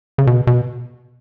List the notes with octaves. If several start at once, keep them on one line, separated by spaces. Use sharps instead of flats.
C#3
B2
B2